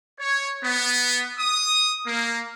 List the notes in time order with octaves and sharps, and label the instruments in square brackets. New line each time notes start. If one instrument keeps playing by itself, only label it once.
[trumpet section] C#5
B3
D#6
A#3